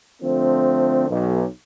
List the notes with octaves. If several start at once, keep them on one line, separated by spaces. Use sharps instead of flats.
D3 F3 A3 C4
B1